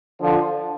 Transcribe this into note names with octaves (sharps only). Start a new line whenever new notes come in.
D3 F3